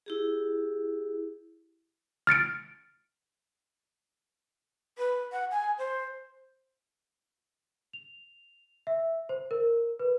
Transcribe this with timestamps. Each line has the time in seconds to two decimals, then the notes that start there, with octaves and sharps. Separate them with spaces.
0.06 E4 G4 G#4
2.27 F6 A6 C#7 D7
4.98 B4
5.32 F#5
5.51 G#5
5.78 C5
7.93 F7
8.87 E5
9.29 C5
9.51 A#4
9.99 B4